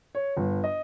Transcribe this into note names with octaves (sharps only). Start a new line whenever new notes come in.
C#5
G1
D#5